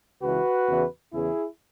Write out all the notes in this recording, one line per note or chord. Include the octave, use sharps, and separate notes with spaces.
C#2 C#3 E3 F#4 B4
E2 C#3 E3
E2 C#3 E3 E4 G#4